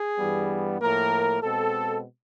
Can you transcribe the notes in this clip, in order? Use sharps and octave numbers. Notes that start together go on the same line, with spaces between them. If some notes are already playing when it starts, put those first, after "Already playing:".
Already playing: G#4
G2 E3 G3 B3
A2 F3 A#3 A#4
B2 G#3 C4 A4